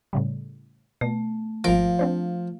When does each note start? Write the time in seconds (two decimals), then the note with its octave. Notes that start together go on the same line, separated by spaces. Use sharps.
0.13 A2 C#3 G3
1.01 B2 A3
1.64 G#1 F3 A#4 F5 D7
1.99 C4 D4 C5